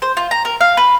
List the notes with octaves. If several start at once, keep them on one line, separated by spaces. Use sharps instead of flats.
C5
F4
A#5
A#4
F5
B4